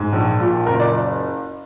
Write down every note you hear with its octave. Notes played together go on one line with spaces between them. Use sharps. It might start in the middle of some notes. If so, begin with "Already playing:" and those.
Already playing: G#2
A#1
A#2
F#1 A#4
D5